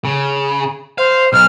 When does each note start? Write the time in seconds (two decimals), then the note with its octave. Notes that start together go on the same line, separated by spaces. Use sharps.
0.05 C#3
0.98 C5 F5
1.33 B1 F6